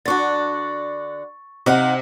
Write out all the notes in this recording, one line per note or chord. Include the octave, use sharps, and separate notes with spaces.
D3 D4 F#4 C#6 A6
C3 D#4 F5 F#5